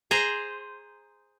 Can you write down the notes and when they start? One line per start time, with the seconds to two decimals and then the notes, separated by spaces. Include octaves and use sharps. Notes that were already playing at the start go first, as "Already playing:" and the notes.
0.11 G#4 C5 A#5